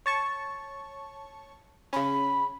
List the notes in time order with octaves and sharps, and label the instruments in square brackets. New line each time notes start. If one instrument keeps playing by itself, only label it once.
[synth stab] C#5 A5 C#6
[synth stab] C#3 C#4 [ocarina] B5